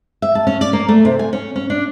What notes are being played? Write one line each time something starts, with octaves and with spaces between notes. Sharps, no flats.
E5
A5
C#4
D5
A#3
A3
C3
G#5
C#4
C#4
D4